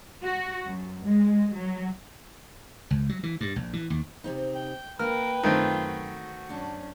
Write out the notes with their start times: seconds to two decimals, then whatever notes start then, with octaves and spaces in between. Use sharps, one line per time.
0.23 F#4
0.66 F#2
1.05 G#3
1.54 F#3
2.91 C#2
3.09 F#3
3.23 E3
3.41 G2
3.56 A#1
3.73 E3
3.90 D#2
4.24 C3 C4 D#4
4.55 G5
4.99 A#3 A#4 B4 G5 F6
5.43 F#2 D#3 A3 C4 F4
5.88 F#4
6.49 F#2 C#4 D4